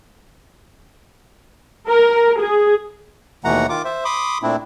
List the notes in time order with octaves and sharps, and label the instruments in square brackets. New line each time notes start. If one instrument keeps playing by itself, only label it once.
[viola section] A#4
G#4
[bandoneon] D#2 B2 E3 A3 F#5 A#5
D#3 F4 D6
C5 E5
B5 C6 D6 D#6
A#2 A3 C4 D4 E4